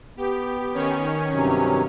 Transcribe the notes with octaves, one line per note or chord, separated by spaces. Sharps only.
B3 G4
D#3 C#4 C#5
G2 C3 F#3